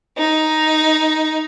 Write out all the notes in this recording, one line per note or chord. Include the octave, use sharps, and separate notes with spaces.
D#4